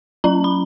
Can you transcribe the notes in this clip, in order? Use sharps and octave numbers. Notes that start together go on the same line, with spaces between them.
F#3 C#4 A#5
B5